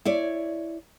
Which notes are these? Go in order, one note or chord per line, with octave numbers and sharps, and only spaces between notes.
E4 C#5 D5